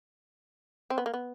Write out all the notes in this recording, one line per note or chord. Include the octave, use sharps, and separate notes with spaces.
C4
B3
A#3
B3